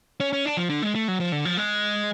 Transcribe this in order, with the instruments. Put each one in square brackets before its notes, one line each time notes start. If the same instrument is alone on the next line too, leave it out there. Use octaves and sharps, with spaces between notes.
[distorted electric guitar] C#4
C#4
D4
F3
D3
G#3
A3
F#3
F3
D3
F3
G#3